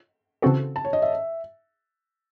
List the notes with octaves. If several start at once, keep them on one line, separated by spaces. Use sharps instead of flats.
C#3 E3 C4 F#4 A4
A5
C#5
D#5
E5